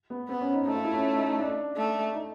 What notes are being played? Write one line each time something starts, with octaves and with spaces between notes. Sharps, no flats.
B3
B3 C4
C#4
D#4
A3 D#4
F4
E4
C#4
D#4
D#4
D4
A3
D#4